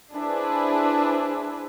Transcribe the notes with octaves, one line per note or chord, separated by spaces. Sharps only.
D4 E4 G#4 B4 C5